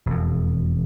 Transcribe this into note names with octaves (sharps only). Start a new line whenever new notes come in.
E1 F2